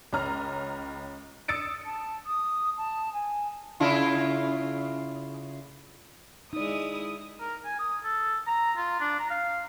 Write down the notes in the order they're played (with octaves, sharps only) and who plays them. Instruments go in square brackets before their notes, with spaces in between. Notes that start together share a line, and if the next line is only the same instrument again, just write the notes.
[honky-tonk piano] C#2 C#4 A#5 F6
D#6 E6 A6 C#7 D7
[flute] A5
D#6
A5
G#5
[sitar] C#3 E4 F4
[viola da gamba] G#3 E4 [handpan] D#4 D5 [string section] D#6
[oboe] A#4
G#5
D#6
A4
A#5
F4
D4
A#5
F5